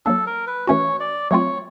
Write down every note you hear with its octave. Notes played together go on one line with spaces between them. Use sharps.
F#3 A#3 D4 A4
A#4
B4
E3 A3 C#4 F#4 C#5
D5
F#3 A3 C4 F4 C#5